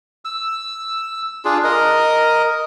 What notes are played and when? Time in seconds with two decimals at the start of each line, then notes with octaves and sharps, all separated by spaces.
0.25 E6
1.45 D4 F4 G#4
1.64 A#4 D#5